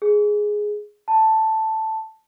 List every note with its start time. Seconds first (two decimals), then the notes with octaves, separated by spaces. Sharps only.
0.02 G#4
1.08 A5